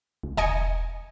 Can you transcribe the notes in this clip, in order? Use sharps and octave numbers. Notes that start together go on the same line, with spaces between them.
C#2
E1 D#5 G#5 C#7